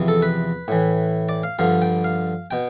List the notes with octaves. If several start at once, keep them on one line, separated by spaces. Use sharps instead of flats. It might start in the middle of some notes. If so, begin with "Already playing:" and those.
Already playing: E2 C3 F3
A4
B4
A2 E3
D5
F5
G2 D3 F3 F5
G5
F5
B2 G5